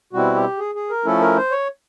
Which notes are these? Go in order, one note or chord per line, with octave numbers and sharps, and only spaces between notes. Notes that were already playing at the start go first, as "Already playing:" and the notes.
B2 G3 C4 E4 F#4
G4
G#4
G#4
A#4
F3 A3 C#4 E4 A4
A#4
C5
C#5